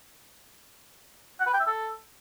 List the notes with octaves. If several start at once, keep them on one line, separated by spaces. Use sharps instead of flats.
F#5
B4
G5
E5
A4